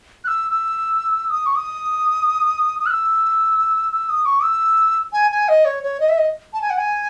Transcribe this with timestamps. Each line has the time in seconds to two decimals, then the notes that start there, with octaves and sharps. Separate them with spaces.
0.24 F#6
0.28 E6
0.51 E6
1.30 D#6
1.46 C#6
1.56 D#6
2.79 D#6
2.86 F#6
2.91 E6
3.92 E6
4.09 D#6
4.26 C#6
4.43 E6
5.13 G#5
5.31 G#5
5.48 D#5
5.65 C#5
5.83 C#5
6.00 D#5
6.09 E5
6.17 D#5
6.53 A5
6.62 G#5
6.70 F#5
6.78 G#5